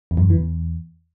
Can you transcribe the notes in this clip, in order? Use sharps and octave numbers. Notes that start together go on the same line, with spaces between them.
E2
F#2
F2
E3
E2